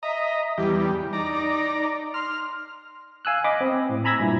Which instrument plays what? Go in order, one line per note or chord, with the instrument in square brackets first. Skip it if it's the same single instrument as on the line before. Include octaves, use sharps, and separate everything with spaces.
[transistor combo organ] D#5 A#5 [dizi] E5
[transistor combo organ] E2 G3 [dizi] G4
[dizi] D#4 [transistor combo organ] D5 A#5
[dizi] C6 [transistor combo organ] F6
[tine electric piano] F5 G#5 E6 F#6
D#5 B5 D6 A#6
C4
A2
G#5 A#5 B5 E6 G#6 A#6
G2 A#2 E4